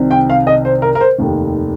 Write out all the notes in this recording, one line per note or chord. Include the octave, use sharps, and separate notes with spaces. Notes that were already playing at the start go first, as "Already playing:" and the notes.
Already playing: C2 C3 D#3
G5
F5
D#5
C5
A#4
A#4
C5
F1 D#2 D#3